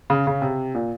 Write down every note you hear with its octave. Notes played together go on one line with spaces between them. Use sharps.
C#3
C#3
C3
A#2